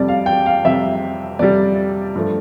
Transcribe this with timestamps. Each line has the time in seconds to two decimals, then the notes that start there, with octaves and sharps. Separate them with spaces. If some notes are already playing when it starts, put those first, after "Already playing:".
Already playing: F2 C3 G3 D5
0.08 F5
0.26 G5
0.46 F5
0.64 F2 C3 G3 E5
1.39 F2 C3 G3 D5
2.15 G2 F3 A3